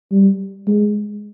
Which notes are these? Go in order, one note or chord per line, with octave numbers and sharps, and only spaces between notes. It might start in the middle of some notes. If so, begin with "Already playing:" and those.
G3
G#3